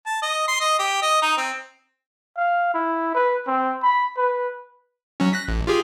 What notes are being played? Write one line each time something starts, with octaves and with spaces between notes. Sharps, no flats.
A5
D#5
C6
D#5
G4
D#5
D#4
C4
F5
E4
B4
C4
B5
B4
F#3 C#4
F#6 A#6 B6
A1
F4 G4 G#4